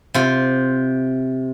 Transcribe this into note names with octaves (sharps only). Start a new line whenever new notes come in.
C3 F4